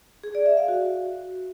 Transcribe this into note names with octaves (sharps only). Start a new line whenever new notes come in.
G#4
D5
E5
F5
F#4